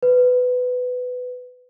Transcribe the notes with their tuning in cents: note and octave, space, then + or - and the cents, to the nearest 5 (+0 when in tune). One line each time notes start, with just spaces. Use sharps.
B4 +15